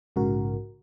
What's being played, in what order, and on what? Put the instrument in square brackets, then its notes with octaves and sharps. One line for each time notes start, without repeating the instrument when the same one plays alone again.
[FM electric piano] A#1 G#2 C#3 F#4 A#4